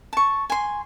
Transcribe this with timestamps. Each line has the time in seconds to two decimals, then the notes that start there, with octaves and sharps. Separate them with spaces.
0.13 A5 C#6
0.50 G#5 C6